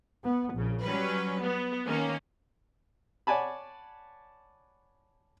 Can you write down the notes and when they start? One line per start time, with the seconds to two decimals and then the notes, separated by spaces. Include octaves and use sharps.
0.23 B3
0.53 A#1 C#3
0.82 F#3 G3 C#4 B4
1.40 B3
1.87 D#3 A#3 C#4
3.27 C#5 D5 F#5 G#5 A5 B5